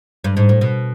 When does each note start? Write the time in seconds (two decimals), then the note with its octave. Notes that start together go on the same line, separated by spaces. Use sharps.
0.24 G2
0.37 G#2
0.49 A2
0.61 B2